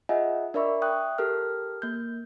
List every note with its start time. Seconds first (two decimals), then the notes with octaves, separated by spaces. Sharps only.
0.09 F4 G#4 D#5 E5 F#5 G#5
0.54 D4 A#4 D5 E5 B5 C#6
0.82 E5 G5 C#6 D#6 F#6
1.18 G4 A4 A#4 F6
1.82 A#3 G6